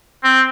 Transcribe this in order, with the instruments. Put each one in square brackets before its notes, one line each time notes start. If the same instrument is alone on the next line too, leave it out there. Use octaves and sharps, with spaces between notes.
[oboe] C4